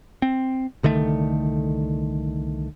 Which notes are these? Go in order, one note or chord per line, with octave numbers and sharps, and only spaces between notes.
C4
C2 D3 D#3 A3